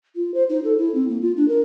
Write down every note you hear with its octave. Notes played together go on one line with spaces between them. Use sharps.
F4
C5
D#4
A4
E4
C4
A#3
F4
D4
A#4